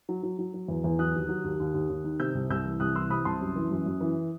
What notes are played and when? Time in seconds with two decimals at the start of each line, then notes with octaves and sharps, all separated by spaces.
0.09 F#3
0.23 F#3
0.39 F#3
0.54 F#3
0.68 E2
0.84 E2
0.99 F#3 D#6 F#6
1.14 D#2
1.29 F#3
1.44 D#2
1.60 D#2
1.74 D#2
1.89 D#2
2.04 D#3
2.20 C3 E6 G6
2.35 C2
2.50 C2 E6 G6
2.66 E3
2.80 C2 D#6 F#6
2.95 E3 C6 E6
3.10 C3 B5 D#6
3.25 C2 A5 C6
3.41 F#2
3.56 E3
3.71 F#2
3.86 F#2
4.01 E3